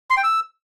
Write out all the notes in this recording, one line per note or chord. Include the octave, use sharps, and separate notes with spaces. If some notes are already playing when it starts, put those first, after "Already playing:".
C6
G5
E6